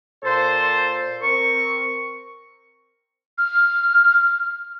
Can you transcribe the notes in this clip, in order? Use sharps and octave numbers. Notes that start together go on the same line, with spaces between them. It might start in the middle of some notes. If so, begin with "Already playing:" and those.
A#2 A4 C5
C4 A#4 C#6
F6